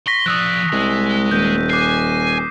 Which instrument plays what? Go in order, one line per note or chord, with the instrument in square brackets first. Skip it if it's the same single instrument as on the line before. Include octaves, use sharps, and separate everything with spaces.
[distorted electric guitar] C6 [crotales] C#6 A#6 B6
[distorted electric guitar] F3 D5 [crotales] D#6 E6 F#6
[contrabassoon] C2 [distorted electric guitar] G#3
[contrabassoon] D#1 [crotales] G6 D#7
[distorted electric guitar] G#5 [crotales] D6 F#6 C7